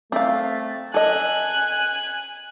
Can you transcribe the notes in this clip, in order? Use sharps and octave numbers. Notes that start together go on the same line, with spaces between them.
A3 C4 F5
A4 D#5 G#5 F#6